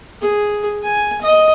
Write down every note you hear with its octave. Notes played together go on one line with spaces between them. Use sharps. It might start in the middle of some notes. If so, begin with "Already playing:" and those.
G#4
G#5
D#5